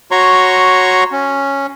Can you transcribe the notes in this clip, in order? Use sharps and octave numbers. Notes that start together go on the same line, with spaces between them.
F#4 C#5 A#5 C6 C#6
C#4